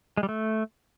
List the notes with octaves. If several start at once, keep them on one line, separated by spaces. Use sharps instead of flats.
G#3
G3
A3